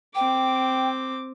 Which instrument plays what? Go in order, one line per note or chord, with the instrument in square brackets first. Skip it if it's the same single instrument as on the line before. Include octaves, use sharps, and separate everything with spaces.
[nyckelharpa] C4 D6 [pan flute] G5